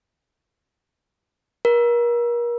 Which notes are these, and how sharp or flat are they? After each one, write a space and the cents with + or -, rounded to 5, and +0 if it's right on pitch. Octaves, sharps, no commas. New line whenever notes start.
A#4 +35